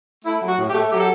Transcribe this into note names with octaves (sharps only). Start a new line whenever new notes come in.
A3 E4
F#3
F#4
A2
G4
A3
F#3 G4
A4